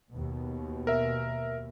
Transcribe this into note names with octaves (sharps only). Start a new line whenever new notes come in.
D#2 B2
A#4 E5